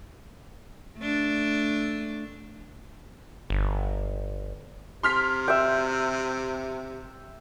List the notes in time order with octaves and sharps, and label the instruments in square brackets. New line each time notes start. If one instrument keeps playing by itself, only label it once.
[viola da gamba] A3 D4
[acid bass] G1
[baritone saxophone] C3 [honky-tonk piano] C6 F6 B6
[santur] E5 G5